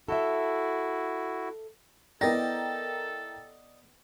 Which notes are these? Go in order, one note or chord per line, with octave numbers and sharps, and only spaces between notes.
E4 F#4 A4 E5
B3 E4 A4 A#4 D5 D#5 G5 A#6